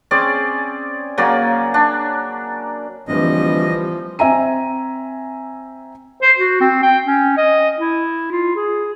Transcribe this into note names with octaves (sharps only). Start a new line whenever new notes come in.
C4 C#4 G#4 D5
C#3 F#3 A#3 D5
D4
D1 E3 F3 G3 D#5
C4 E5 G#5 A#5 D#7
C5
F#4
C4
G5
C#4
D#5
E4
F4
G#4